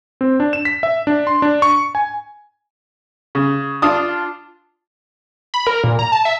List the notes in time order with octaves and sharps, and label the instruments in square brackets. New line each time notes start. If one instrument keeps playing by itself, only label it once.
[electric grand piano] C4
D4
E7
B6
E5
D4
C6
D4
C#6
G#5
[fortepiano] C#3
D4 F4 D#6
[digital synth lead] B5
A#4
A#2
A#5
A5
E5